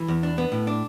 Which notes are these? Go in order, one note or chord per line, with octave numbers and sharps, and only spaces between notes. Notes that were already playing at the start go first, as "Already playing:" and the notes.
Already playing: E3
E2
D4
B3
A2
D4